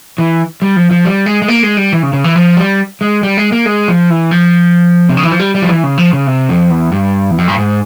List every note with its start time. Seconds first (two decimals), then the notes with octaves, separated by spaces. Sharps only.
0.18 E3
0.62 G3
0.76 F3
0.91 F3
1.05 G3
1.26 G#3
1.42 G#3
1.48 A#3
1.63 G#3
1.77 G3
1.93 E3
2.03 C#3
2.13 C#3
2.24 E3
2.36 F3
2.57 G3
3.01 G#3
3.23 G3
3.38 G#3
3.52 A#3
3.66 G#3
3.88 F3
4.10 E3
4.31 F3
5.09 C3
5.17 C#3
5.24 E3
5.32 F3
5.40 G3
5.54 G3
5.62 F3
5.69 E3
5.83 C#3
5.98 F3
6.13 C#3
6.27 C3
6.49 F2
6.70 E2
6.92 G2
7.30 E2
7.38 F2
7.48 G2
7.58 G#2